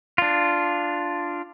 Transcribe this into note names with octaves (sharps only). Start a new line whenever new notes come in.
D4 F4